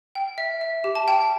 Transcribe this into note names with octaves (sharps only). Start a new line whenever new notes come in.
G5
E5
E5
G4
A5
G4 G5